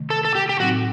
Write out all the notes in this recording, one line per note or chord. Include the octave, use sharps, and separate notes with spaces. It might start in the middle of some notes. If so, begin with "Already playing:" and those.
Already playing: C3 D#3 A3
A4
A4
G4
G4
A2 F#3 C4 D#4 F#4